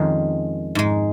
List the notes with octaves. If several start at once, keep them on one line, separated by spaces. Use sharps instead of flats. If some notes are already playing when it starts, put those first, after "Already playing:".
Already playing: F2 D#3 G#3 C#4
G#2 G#3